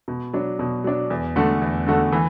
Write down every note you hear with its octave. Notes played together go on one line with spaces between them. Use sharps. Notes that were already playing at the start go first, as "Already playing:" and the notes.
B2
F#3 D4
B2
F#3 D4
E2
D3 A3 F#4 A4
E2
D3 A3 F#4 A4
E3